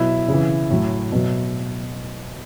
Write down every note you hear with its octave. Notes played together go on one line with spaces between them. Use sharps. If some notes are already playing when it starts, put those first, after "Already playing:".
Already playing: B2 F#3 E4 E5
C#3
E3
A2 F#3
B2 F#3